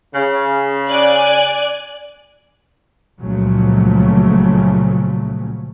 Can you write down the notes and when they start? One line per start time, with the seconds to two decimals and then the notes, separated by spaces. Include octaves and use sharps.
0.14 C#3
0.88 D5 G#5 F#6
3.20 C#2 A#2 C#3 F3 F#3 A3